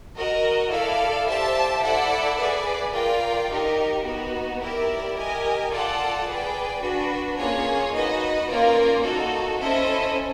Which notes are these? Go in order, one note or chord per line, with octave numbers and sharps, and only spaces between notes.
F#4 A#4 D#5
E4 A4 D5 F5
G4 C5 E5 A5
E4 A4 D5 F#5
G#4 B4 D5
F4 A#4 D5 G5
D#4 G4 A#4
B3 D#4 F#4
E4 G4 A#4 D5
G4 A#4 D#5 G#5
F4 A4 D5 F#5 A5
G#4 B4 D5 G5
D4 F#4 B4
A#3 C#4 F4 G#4 C#5
D#4 F#4 B4 D#5
A#3 C#4 F4 A#4 D5
D#4 F#4 A4
C#4 E4 A4 C5 D#5